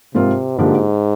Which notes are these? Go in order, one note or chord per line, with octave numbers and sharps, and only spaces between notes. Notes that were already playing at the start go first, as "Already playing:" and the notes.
G#2 C3 F3 C4 F4 A#4
G#2 D3 F3 A#3 D4 G4